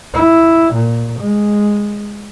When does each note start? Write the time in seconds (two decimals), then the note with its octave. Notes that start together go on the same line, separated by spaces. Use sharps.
0.14 E4
0.74 A#2
1.20 G#3